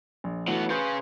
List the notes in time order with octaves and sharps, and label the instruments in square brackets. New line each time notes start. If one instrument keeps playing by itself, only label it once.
[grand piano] A#1
[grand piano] E3 A3 F#4 [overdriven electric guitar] F#3 B3
[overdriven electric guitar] C#3 C#4 [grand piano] B4 C6 G6